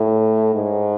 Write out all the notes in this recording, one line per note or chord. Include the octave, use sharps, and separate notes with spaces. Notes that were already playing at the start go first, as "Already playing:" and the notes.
Already playing: A2
G#2